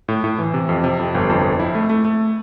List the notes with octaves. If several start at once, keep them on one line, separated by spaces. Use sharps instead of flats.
A2
A2
E3
C3
F2
C3
F2
G1
F2
F2
E4
A3
A3
A3